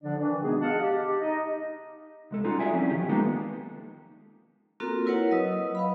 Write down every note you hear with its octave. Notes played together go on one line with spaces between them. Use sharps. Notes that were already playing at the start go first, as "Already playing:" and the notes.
D3 F3 D4 D5
D#3 E3 D4
C3 G#3 B3 D#4 F#4 G#4
D#5 F5 F#5 A5
G4
D#4 D#5
C2 G#3 A4
G3 C#4 D#4 F4 F#4
G#4 A4 D5 E5 G5 G#5
F3 F#3 C4 C#4 E4
D#3 F3 G4
G#3 A#3 B3 D#4 F4 A4
A#3 C4 F4 F#4 A4 A#4
E4 A#4 B4 C#5 F#5
F#3 D#5 D#6 E6
B4 F5 B5